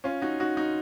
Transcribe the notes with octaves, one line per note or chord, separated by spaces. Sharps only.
C#4 F4
D#4 F#4
D#4 F#4
D#4 F#4